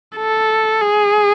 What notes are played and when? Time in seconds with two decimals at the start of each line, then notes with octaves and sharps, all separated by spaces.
0.17 A4
0.82 G#4